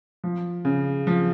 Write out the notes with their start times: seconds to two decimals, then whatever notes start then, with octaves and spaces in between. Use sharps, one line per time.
0.24 F3
0.65 C#3
1.07 F3